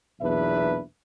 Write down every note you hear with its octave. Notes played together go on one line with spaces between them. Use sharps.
B1 E2 A#2 D4 B4 E5